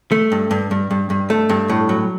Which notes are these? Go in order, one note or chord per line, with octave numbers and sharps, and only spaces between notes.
A3
G2
G2
G2
G2
G2
A3
G2
A2
F#3